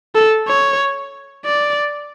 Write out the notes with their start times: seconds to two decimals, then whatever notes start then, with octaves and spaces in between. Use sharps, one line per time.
0.15 A4
0.48 C#5
1.45 D5